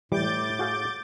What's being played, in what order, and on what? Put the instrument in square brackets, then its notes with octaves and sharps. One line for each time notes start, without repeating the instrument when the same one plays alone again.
[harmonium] A2 [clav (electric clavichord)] E3 G3 [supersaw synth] D6 G6 A6
[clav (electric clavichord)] F#4 G#4 F5